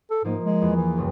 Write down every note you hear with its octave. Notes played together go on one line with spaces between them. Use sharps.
A4
G#2 F3 A#3 D#5
G#3
E2
E3
C#2 F#2 G3